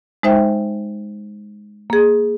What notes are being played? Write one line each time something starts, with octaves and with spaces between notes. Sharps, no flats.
G#3 D#4 C5 E5 G5
A#3 G#4